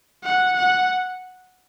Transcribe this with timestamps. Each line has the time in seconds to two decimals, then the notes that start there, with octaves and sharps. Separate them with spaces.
0.24 F#5
0.57 F#5